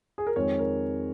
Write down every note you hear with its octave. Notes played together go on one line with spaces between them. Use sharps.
G#4
A#4
F2 D#3 G#3 C#5
A#4